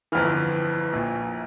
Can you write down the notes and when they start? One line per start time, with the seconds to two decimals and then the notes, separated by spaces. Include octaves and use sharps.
0.12 G1 F2 E3 F6
0.93 A#1 A#2